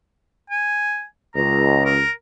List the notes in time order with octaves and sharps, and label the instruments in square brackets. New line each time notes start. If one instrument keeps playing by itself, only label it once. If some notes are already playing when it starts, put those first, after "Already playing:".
[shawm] G#5
[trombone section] C#2 [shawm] A#5
[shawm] A#4